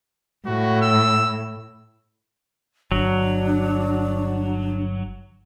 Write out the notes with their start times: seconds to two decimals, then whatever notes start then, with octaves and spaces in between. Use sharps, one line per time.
0.46 A2 F#4
0.82 E6
2.92 G1 F#3 D4